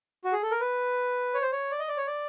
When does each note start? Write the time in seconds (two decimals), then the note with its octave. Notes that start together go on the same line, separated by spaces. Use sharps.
0.24 F#4
0.32 G#4
0.43 A4
0.51 A#4
0.60 B4
1.34 C#5
1.42 C5
1.52 C#5
1.71 D5
1.79 D#5
1.88 D5
1.97 C#5
2.07 D5